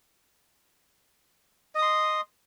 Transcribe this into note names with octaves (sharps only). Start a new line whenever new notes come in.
D#5 C6 D#6